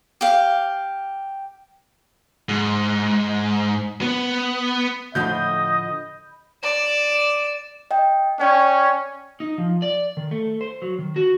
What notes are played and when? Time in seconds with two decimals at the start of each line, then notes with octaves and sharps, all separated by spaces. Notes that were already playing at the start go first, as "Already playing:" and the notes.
0.21 G4 F5
2.49 G#2
4.01 B3
5.15 A2 D3 F3 D#5 B5 G6
6.63 D5 E7
7.91 D#5 G5
8.40 C#4 D5 G5 C#6
9.40 D#4
9.58 F3
9.82 D5
10.17 D#3
10.31 A3
10.61 C5
10.82 F#3
10.99 D#3
11.16 F#4